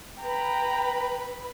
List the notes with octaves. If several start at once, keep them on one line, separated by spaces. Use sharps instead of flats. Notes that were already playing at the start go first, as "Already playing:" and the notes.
B4 G5 A#5 B5